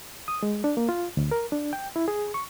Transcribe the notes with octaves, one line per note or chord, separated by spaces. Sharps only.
D#6
G#3
D4
A#3
F4
D2
A#4
D4
G5
E4
G#4
C#6